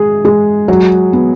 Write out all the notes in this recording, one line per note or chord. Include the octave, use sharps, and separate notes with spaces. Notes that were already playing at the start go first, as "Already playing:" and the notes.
Already playing: G#3 G#4
G#3
F#3
B3